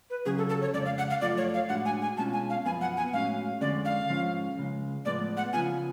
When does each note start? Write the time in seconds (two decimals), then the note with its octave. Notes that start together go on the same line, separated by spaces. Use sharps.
0.10 B4
0.25 C#2 C#3 F#3 C#4 G#4
0.38 A4
0.49 A4
0.61 C#5
0.74 F2 C#3 G#3 D5
0.85 F5
0.98 F#5
1.10 F5
1.21 F#2 F3 A3 F4 D5
1.37 C#5
1.54 F5
1.69 A2 G#3 D4 F#4 F#5
1.85 G#5
2.02 G#5
2.17 B2 G#3 C#4 F4 A5
2.33 G#5
2.50 F5
2.65 F#2 F3 B3 G#5
2.81 F#5
2.97 G#5
3.13 A2 G#3 C#4 F#4 F5
3.61 F2 D3 G#3 C#4 D5
3.85 F5
4.09 G#2 F3 G#3 C#4 F4
4.57 C#2 C#3 G#3
5.05 A2 F3 G#3 B3 D5
5.37 F#5
5.53 C#3 F3 B3 F4 G#5